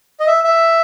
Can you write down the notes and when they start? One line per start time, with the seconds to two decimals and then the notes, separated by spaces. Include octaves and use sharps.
0.20 D#5
0.27 E5
0.44 E5